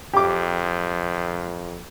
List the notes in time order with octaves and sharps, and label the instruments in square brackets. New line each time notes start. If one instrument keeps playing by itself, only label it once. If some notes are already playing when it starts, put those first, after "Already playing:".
[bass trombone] F2 [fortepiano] G4 D6